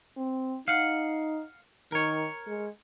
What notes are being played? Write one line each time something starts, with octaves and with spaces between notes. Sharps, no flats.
C4
D#4 F5 F#5
D#3 A#4 C#5
G#3